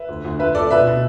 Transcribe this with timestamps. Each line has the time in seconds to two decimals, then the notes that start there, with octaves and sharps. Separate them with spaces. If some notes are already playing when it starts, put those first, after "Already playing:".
Already playing: B4 E5
0.09 D2
0.25 D2
0.39 D2 B4 E5
0.55 D2 A4 D5
0.71 B2 B4 E5
0.87 B2